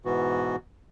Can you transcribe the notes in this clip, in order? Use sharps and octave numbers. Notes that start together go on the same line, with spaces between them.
G#2 B2 E3 B3 F#4